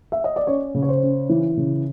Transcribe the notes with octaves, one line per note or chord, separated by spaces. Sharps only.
E5
D#5
D5
C#4 C#5
C#3
C#5
C5
C#4
E3
C#3